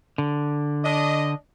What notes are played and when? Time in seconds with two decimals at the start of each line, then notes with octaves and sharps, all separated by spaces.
0.18 D3
0.84 D4 D#5